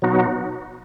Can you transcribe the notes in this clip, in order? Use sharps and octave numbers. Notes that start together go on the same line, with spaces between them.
B2 F#3 B3 D#4 F#4